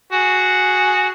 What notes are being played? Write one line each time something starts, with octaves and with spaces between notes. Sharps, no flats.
F#4 G#4